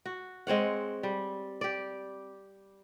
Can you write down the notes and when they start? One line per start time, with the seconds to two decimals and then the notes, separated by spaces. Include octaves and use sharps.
0.05 F#4
0.47 G#3 C4 C#5 F#5
1.03 G3
1.61 G4 D5